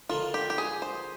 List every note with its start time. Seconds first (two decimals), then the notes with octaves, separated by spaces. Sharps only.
0.09 D3 F3 A#3 F4
0.34 G4
0.50 G4
0.58 G#4
0.82 C5